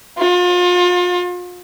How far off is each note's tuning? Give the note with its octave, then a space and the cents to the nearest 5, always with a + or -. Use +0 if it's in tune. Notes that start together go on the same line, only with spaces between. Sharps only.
F4 +35